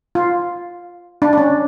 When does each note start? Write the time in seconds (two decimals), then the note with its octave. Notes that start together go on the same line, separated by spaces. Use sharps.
0.15 F4
1.22 D4
1.33 D4
1.38 C#4